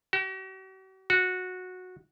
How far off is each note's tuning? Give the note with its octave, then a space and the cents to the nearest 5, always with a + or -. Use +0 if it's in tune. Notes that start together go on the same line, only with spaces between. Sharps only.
F#4 +45
F#4 -15